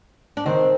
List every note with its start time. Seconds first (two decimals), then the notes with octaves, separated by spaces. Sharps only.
0.37 D4
0.45 D#3 C4